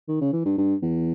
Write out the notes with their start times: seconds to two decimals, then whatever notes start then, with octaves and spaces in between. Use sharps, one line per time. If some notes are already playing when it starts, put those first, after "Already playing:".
0.08 D#3
0.21 C#3
0.33 E3
0.45 G2
0.58 G2
0.82 E2